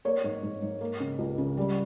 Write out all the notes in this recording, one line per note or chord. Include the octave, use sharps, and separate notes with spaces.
A#3 C#5
G#2
G#2
G#2
A#3
C#3
C#2
C#3
G3